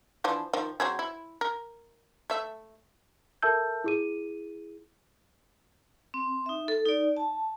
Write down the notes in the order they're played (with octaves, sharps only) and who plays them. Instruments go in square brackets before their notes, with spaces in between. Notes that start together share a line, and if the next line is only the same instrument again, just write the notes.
[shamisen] E3 F3 D4
D#3 F3
F#3 C4 G#4
E4
A#4
A3 E5
[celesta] A4 A#4 E5 A5 E6 G6
E4 G#4 D#7
[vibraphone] C4
D#4 E5
A4
D#4 D5
A5